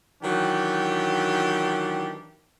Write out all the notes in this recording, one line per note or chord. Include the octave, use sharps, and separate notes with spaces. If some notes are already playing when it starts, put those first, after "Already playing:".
D#3 E3 F#3 D4 G4